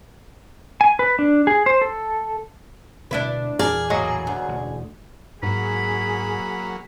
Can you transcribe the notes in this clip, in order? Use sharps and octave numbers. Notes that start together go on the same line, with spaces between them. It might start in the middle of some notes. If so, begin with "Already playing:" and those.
G#5
B4
D4
G#4
C5
A4
D1 B2 A3 D4 E4 B4
E2 A#2 E3 G#4 A#4 D5 A5
A2 F#3 A#3 D#5
D2
E1 A1
G#2 F#3 A#3 G#4 B5